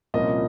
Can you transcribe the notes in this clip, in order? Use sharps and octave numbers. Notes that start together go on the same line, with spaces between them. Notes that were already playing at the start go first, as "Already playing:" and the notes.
C2 A#2 F3 A#3 C#4 D#5